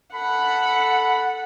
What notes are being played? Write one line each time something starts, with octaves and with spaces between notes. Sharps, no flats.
A4 F#5 B5